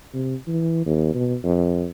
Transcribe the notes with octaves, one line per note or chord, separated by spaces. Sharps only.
C3
E3
D#2
B2
F2